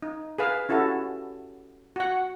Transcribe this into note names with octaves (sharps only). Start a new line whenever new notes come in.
D#4
G#4 B4 F5
C#4 E4 F#4 G4 A4
F#4 F#5